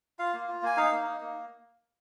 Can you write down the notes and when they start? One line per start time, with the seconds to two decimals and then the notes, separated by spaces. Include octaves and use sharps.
0.19 F4 F5
0.34 A#3
0.48 F4
0.62 A#3 G#5
0.77 D#4 F5
0.92 A#3
1.07 D#4
1.21 A#3